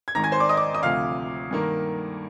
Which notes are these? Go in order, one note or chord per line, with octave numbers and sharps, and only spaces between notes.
G#6
G#1 G#2 D#3 A#5 A#6
G#5 G#6
C5 C6
D5 D6
D#5 D#6
D5 D6
D#5 D#6
D2 C3 F3 F5 F6
G2 D#3 A#3